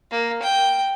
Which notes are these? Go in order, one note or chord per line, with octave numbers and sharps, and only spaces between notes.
A#3
G5